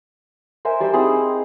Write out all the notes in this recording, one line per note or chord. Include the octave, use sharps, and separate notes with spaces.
A#4 C5 E5 G#5
G3 C5 C6 E6
C4 D#4 E4 G#4
D#4